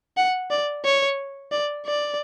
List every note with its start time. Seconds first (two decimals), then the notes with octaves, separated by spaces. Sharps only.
0.17 F#5
0.50 D5
0.84 C#5
1.51 D5
1.86 D5